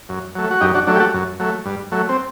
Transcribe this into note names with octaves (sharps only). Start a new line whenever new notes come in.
F#2
F#3 A3
F#4
F#2 D#4 G4
D4 F#4
F#3 A3 D4
G4
F#4 A4
F#2
F#3 A3
G2
F#3 A3
C4